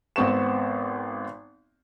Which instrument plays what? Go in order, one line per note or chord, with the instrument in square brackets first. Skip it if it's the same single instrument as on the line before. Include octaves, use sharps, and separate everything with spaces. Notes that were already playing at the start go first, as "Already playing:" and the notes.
[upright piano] G#1 B3 C4 C#6 E7